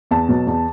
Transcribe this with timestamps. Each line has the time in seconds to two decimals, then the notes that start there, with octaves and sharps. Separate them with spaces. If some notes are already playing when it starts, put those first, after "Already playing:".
0.11 E2 A5
0.29 B2 F#3
0.47 E2